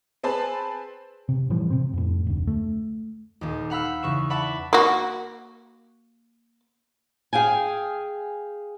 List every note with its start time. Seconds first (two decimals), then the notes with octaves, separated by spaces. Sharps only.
0.23 C4 G#4 B4 C5 A5 B5
1.29 C3
1.50 A2 E3 F3 G3
1.70 C3 C4
1.93 F2 A2
2.27 F1 D2
2.47 A3
3.41 D#1 D#2
3.70 F5 F#5 B5 E6 F6
3.85 G6
4.03 E2 C#3 C#6 E7
4.30 D5 E5 F#5 A5 B5 C#6
4.73 A#3 F#4
7.33 G#4 F5 G5 G#5